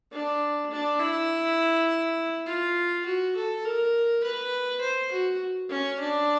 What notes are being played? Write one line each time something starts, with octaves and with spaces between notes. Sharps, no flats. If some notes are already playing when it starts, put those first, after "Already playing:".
D4
D4
E4
F4
F#4
A4
A#4
B4
C5
F#4
C#4
D4